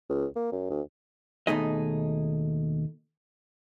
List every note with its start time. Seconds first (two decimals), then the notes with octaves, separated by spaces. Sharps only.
0.09 C#2
0.36 A#3
0.52 F#2
0.70 D2
1.47 D#2 B2 A3 D#4 G#4 D#5